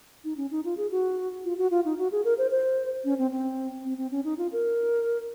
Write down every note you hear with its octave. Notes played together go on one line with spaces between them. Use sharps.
D#4
C#4
D#4
F4
G#4
F#4
F4
F#4
F4
D#4
F#4
G#4
A#4
C5
C5
C#4
C4
C4
C4
C4
C#4
D#4
F4
A#4